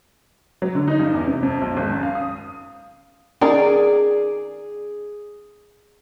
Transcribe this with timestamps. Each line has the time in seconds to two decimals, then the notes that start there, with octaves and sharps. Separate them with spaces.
0.62 F#3
0.75 D3
0.88 D#4
0.99 G2
1.14 E2
1.27 C3
1.43 F2
1.61 B1
1.77 G#1
1.89 F#2
2.03 F5
2.15 D#6
3.41 D#3 C4 C#4 G#4 A#4 D5